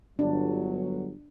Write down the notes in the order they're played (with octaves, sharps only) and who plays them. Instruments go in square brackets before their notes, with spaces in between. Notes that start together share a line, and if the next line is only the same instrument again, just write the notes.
[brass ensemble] G1 F#3 [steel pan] D4